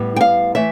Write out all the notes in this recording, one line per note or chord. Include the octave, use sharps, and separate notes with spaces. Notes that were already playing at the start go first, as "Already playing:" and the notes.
Already playing: A2 G3 B3
G5
F5
E3 A3 E5